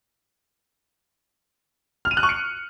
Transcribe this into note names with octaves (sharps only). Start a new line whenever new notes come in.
F6
D#7
F#6
C#6
C#7